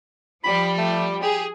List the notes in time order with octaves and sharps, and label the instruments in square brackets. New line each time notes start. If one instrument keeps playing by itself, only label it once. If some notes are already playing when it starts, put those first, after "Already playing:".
[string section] F3 G3 [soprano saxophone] B5
[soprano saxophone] A3
[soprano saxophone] G4 [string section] G#4